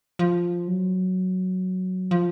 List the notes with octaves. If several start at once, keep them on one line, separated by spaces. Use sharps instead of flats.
F3
F#3
F3